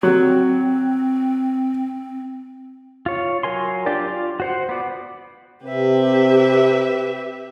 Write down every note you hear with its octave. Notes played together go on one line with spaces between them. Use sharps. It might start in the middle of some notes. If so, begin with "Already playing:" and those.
F#3 C4
F4 C#5
F#3 A#4 G#5 C6
D4 F4 G4 D5
F4
F#4 C5 F#5
B3 D5
C3 G4 B4 E5